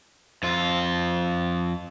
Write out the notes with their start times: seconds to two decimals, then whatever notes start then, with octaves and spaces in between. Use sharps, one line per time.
0.43 F2 F4